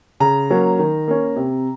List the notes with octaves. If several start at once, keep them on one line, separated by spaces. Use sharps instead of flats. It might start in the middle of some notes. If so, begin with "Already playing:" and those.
C#3 A#5
F#3 A#3 C#4
D#3
A#3 C#4
C3